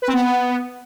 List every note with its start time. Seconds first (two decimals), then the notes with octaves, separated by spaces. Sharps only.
0.02 B4
0.08 C4
0.13 B3